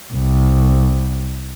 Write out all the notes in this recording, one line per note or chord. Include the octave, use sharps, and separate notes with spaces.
C2